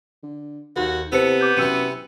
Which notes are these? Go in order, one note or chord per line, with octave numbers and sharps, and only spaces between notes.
D3
D#2 D#3 F#4 A4
C3 B3 E4 A4 C5 C#7
D6 G6
F#2 C3 E3 E6 C#7 D#7